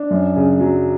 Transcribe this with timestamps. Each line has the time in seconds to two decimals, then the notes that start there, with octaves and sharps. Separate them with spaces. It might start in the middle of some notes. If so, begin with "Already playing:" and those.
Already playing: D4
0.11 F#2
0.36 C#3
0.60 F#3